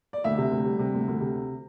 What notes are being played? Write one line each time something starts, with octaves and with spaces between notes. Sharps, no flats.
D5
D2 E5
C3
D2
G3
C3
D2
D2
C3